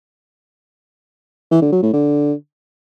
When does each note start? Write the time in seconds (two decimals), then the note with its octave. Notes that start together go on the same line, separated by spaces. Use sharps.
1.51 E3
1.62 D3
1.72 F#3
1.83 A2
1.93 D3